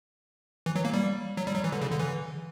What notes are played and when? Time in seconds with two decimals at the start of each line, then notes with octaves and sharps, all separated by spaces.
0.66 E3
0.76 F#3
0.85 A#3
0.93 G3
1.37 F#3
1.47 G3
1.55 F#3
1.64 E3
1.72 D3
1.81 C#3
1.91 D3
1.99 E3